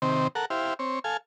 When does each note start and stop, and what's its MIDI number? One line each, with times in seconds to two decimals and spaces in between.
0.02 0.28 48
0.02 0.28 51
0.02 0.28 60
0.35 0.45 69
0.35 0.45 70
0.35 0.45 78
0.50 0.74 64
0.50 0.74 67
0.50 0.74 72
0.50 0.74 77
0.79 0.99 60
0.79 0.99 73
1.04 1.17 69
1.04 1.17 77
1.04 1.17 80